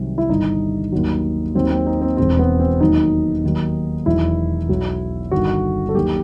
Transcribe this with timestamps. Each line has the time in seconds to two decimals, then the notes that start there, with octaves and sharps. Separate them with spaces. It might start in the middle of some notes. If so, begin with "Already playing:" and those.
Already playing: C2 C3 D#3 F#3
0.18 E4
0.29 G1 G2 D#3 D#4
0.92 D#2 D#3 F#3
1.55 D#2 D#3 F#3 C4
1.71 C4
1.87 D#4
2.01 C4
2.17 E1 E2 B2 C4
2.39 B3
2.60 C4
2.80 D#2 D#3 F#3 D#4
3.43 D#2 D#3 F#3
4.06 E1 E2 D#3 F#3 E4
4.69 B1 B2 F#3
5.31 G1 G2 D#3 F#4
5.89 A4
5.94 D#2 D#3 F#3 G4